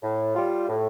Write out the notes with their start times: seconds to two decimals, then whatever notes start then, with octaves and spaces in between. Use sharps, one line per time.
0.02 A2
0.35 G3 F4
0.68 A2